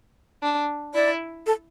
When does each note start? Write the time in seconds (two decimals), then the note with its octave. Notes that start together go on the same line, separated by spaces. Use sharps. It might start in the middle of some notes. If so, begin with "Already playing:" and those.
0.43 D4
0.94 E4 D5
1.46 A4